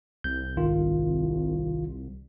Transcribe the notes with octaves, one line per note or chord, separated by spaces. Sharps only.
C2 G6
G#1 D#3 F4